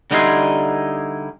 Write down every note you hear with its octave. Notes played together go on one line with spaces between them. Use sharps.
D3 G3 D#4 E4 G#4 C6